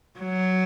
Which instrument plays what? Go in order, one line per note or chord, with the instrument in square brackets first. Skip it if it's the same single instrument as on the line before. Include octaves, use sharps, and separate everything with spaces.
[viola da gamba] F#3